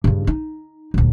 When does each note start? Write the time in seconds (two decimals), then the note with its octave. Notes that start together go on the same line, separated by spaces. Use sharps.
0.04 G2 C#3
0.27 D#4
0.94 D#1 D2